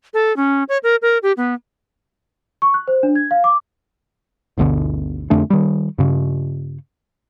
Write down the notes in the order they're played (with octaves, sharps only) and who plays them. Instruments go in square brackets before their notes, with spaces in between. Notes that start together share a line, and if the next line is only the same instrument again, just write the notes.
[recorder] A4
C#4
C#5
A#4
A#4
G4
B3
[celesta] C#6
F#6
C5
D4
G#6
F5
D6
[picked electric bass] G1 D2 B2 D3
F2 D3 A3 D4
D#3 G3
G2 C#3